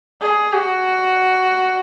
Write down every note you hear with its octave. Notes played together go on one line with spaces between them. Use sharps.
G#4
F#4